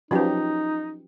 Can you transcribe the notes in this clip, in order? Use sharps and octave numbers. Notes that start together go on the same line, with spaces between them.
F3 F#3 C#4 D#4 G4 B4